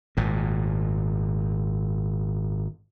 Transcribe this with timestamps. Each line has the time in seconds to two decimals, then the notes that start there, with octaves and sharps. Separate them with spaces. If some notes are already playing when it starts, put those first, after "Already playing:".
0.17 G#1 A#2